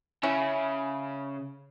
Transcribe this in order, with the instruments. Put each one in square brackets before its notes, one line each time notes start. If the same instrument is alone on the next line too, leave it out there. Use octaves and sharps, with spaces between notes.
[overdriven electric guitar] C#3 [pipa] C#4 E4